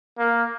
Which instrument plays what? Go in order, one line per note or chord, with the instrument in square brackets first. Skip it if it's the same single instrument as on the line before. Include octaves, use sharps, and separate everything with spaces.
[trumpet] A#3